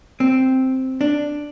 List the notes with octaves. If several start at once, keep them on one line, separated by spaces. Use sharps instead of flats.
C4
D4